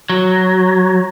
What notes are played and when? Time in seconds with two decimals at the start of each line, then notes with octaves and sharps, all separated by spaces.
0.10 F#3